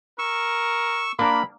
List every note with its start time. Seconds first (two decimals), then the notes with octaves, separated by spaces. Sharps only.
0.19 A#4 C#6 E6
1.19 A#3 D4 A#4 B5